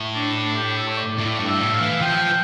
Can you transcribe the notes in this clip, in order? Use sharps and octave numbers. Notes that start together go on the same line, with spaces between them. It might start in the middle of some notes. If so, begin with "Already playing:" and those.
Already playing: A2
D4
D4
G4
A4
C#5
D5
A2 D5
G2
E5
A2
F5
E3
F3 G5